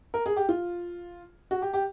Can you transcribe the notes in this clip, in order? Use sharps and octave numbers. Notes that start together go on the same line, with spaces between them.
A#4
G#4
G4
F4
F#4
G4
G4